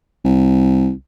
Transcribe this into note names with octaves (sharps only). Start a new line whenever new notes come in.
C2